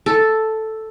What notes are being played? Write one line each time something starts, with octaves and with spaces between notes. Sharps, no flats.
A4